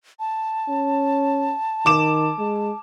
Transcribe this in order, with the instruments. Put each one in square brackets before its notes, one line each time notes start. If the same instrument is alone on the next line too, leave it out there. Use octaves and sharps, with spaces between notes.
[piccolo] A5
[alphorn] C#4
[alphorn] D#3 [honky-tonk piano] D6 E7
[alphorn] G#3